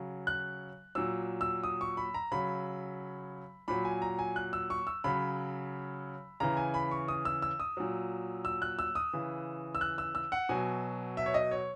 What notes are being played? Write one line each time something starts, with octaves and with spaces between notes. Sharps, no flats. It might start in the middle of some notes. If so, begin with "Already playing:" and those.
Already playing: C#3 F#3
F#6
A#2 F#3 E6
E6
D#6
C#6
B5
A#5
C#3 F#3 B5
A#2 F#3 B5
G#5
A#5
G#5
F#6
E6
C#6
E6
C#3 F#3 B5
C#3 E3 A#5
G#5
B5
C#6
D#6
E6
E6
D#6
A#2 F#3
E6
F#6
E6
D#6
C#3 E3
E6
F#6
E6
E6
F#5
B2 F#3 G#5
E5
C#5
D#5
C#5